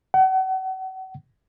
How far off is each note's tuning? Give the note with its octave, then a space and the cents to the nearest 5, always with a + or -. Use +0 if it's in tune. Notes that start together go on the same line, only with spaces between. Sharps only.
F#5 +35